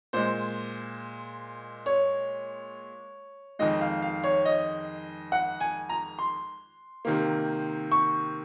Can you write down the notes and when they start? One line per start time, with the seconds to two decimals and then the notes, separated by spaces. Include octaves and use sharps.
0.13 A#2 G#3 C5
1.86 C#5
3.59 F2 D#3 G#3 D#5
3.81 F5
4.02 F5
4.24 C#5
4.45 D#5
5.32 F#5
5.61 G#5
5.89 A#5
6.19 C6
7.05 C3 D#3 A#3
7.92 C#6